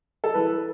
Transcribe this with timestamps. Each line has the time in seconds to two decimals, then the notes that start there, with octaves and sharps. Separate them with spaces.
0.24 A4
0.34 E3 B4